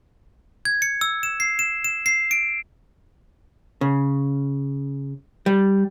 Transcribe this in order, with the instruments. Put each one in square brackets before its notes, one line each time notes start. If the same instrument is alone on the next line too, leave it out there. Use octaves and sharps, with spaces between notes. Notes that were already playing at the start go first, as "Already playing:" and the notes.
[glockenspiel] G#6
C#7
E6
E7
C7
E7
E7
C7
D7
[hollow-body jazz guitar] C#3
G3